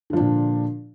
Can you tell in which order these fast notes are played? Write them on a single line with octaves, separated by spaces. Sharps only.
D3 F3 D4 A#2